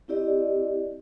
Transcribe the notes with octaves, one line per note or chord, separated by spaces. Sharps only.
C4 E4 G4 D5 D#5